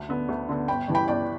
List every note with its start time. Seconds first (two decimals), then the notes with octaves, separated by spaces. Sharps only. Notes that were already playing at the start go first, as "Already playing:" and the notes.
Already playing: D2
0.09 D3 B3
0.29 D2
0.49 D3 B3
0.68 G1 G5 B5
0.88 G2 E3
0.95 G5 B5
1.08 G1 D5 G5